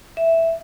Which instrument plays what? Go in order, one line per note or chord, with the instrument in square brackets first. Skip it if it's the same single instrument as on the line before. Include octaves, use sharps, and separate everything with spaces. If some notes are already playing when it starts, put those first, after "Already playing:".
[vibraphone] E5